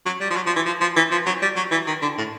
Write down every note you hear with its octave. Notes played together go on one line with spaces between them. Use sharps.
F#3
G3
F3
F#3
F3
E3
F3
F3
E3
F3
F#3
G3
F#3
E3
D#3
D3
A2